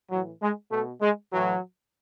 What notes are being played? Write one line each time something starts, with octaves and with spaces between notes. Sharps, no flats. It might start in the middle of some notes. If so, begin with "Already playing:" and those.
A2 E3 F#3
G#3
B2 A3
G#3
A2 E3 F#3